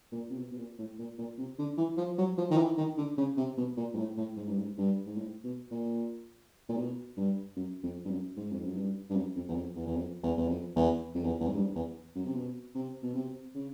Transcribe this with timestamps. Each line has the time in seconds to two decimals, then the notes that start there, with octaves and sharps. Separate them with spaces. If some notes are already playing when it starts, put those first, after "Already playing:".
0.12 A#2
0.30 C3
0.39 B2
0.52 B2
0.58 A#2
0.79 A2
0.99 A#2
1.18 A#2
1.38 C3
1.59 D3
1.78 E3
1.98 F3
2.18 F#3
2.38 F3
2.51 D#3
2.58 E3
2.78 D#3
2.97 D3
3.18 C#3
3.37 C3
3.58 B2
3.77 A#2
3.94 G#2
3.98 A2
4.17 A2
4.37 G#2
4.48 G2
4.59 G#2
4.78 G2
5.06 G#2
5.18 A2
5.44 B2
5.71 A#2
6.69 A#2
6.77 B2
7.17 G2
7.57 F#2
7.83 F2
8.06 G2
8.10 F#2
8.37 G#2
8.52 F2
8.64 F#2
8.77 G2
9.10 G2
9.16 F#2
9.36 F2
9.48 E2
9.56 F2
9.76 E2
9.86 E2
9.96 F2
10.23 E2
10.38 E2
10.49 F2
10.76 E2
11.15 F2
11.24 E2
11.41 E2
11.48 G#2
11.55 G2
11.76 E2
12.16 F#2
12.26 C3
12.36 B2
12.75 C3
13.03 B2
13.15 C3
13.55 C#3